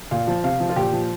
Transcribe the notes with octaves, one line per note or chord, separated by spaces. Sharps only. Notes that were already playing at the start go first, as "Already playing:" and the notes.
A#2 F5
F3
C3 F5
F3
F4
A#2 G4
F3